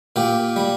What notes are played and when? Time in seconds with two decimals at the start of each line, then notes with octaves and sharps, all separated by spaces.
0.16 A#2 G4
0.56 G3